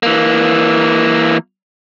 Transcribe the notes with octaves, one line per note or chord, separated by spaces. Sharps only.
E3 A#3